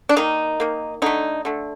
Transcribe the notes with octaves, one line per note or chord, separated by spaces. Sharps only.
D4
D#3 A#3 D#4
D#3 A#3
D3 A3 D#4
D3 A3